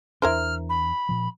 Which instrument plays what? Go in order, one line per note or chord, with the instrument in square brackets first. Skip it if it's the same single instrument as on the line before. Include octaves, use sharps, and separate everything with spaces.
[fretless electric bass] E2 D4 [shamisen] E4 A#4 C5 [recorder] F6
[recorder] B5
[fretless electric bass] A#2 F3